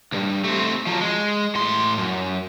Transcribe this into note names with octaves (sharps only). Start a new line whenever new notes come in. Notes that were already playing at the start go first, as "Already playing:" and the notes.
C#2 G2
A3 C4
F3 F#3
G#3
A2 C6
F#2